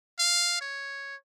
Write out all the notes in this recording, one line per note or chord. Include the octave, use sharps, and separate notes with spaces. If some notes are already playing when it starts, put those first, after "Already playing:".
F5
C#5